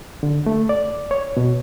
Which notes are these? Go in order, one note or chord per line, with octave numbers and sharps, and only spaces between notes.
D3
A3
D5
C#5
B2